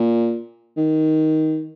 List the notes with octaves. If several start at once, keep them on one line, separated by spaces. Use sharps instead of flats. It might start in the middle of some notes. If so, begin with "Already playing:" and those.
Already playing: A#2
D#3